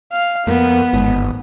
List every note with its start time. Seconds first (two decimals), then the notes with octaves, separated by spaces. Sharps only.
0.12 F5
0.47 F2 A#3 B3 A#4
0.93 G1 D#2 G#2 D#5